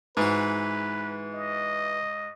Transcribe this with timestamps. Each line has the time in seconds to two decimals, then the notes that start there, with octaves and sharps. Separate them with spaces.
0.17 G#2 E3 F#4 B4
1.34 D#5